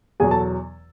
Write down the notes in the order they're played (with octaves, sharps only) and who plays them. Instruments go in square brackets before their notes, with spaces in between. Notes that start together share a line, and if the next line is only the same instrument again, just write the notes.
[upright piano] E2 B2 F#3 G#4 G#5
A4 A5